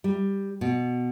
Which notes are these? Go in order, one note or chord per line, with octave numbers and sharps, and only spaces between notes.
G3
B2